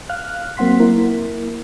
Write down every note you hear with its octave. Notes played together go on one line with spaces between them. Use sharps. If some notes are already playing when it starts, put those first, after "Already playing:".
F5 F6 F#6
F#3 A#3 C4 F#5 C6 B6
A#3 E4 A#4